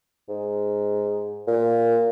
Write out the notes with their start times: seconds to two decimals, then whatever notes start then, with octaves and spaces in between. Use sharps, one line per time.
0.29 G#2
1.47 A#2